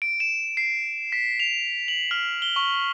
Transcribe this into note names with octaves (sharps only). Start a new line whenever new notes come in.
D7
E7
C7
B6
F7
F#7
F6
G7
C#6